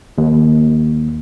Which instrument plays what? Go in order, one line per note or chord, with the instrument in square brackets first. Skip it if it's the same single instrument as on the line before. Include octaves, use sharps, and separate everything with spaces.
[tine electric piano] D#2